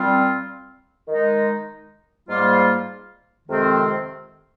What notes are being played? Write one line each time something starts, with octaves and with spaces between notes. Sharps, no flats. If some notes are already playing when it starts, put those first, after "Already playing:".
Already playing: A#2 G3 C4 F4
D#3 G#3 D#4
G#2 G3 A#3 F4
F2 C3 D#3 G#3 C4